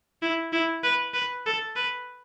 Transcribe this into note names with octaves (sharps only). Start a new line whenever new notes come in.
E4
E4
B4
B4
A4
B4